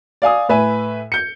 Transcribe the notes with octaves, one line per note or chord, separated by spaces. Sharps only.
D5 F5 G#5 D#6
A2 B4 E5 G#5
G6 C#7